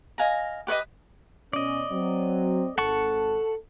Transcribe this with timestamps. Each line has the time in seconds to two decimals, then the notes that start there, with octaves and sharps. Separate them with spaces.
0.18 D#5 F5 G#5 A#5
0.67 G4 B4 C#5 D#5
1.53 B2 C#4 D5 D#5
1.92 F#3 C4
2.78 G#1 A4 F#5 A5 C#6